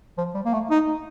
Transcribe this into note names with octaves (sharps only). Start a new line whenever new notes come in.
F3
G3
A#3
A3
D#4